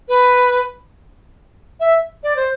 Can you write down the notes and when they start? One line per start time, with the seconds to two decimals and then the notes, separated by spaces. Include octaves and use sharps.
0.09 B4
1.80 E5
2.24 D5
2.36 C5